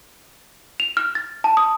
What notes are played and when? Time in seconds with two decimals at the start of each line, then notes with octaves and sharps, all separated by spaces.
0.80 F7
0.97 F6
1.15 A6
1.44 A5
1.57 D#6